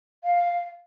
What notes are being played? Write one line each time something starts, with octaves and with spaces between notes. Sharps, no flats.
F5